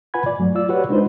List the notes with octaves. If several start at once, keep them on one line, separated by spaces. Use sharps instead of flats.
F4 B4 F#5 G#5 B5 G#6
D5
G2 F#3 A3
F4 D5 E6
F#4 G4 B4 C#5 F#5
G#3 D4 D#4 F4 B4 C5